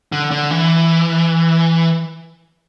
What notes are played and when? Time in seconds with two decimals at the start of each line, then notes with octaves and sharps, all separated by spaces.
0.12 D3
0.31 D3
0.51 E3